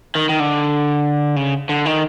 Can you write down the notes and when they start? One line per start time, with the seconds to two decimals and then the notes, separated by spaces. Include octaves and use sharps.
0.15 D#3
0.29 D#3
0.40 D3
1.36 C#3
1.69 D3
1.86 D#3